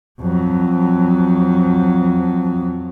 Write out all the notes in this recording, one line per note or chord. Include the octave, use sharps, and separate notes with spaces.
F2 F#3